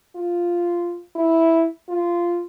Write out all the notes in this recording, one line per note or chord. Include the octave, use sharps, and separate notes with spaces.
F4
E4
F4